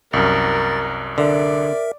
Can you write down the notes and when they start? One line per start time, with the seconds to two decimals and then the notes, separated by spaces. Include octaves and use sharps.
0.13 C2 F#2 A#4 A6
1.18 D3 A#4 D5 E5